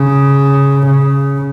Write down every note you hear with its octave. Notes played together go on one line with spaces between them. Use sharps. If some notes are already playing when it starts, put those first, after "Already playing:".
Already playing: C#3
C#3